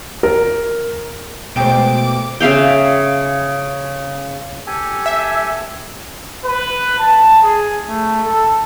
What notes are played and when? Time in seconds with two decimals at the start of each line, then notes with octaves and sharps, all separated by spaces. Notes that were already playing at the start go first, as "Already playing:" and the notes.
0.23 A#4
1.56 B2 G#3 A3 C5 G5 D6 D7
2.40 C#3 E5 F5 G5
4.67 G4 A4 G#5
5.06 E5
6.46 B4
6.99 A5
7.43 G#4
7.88 A3
8.23 A4